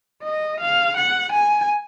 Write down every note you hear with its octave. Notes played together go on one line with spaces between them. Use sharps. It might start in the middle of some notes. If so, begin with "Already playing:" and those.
D#5
F5
F#5
G#5